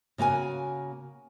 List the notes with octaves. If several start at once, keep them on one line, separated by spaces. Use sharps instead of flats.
C#3 A#3 F#4 G#5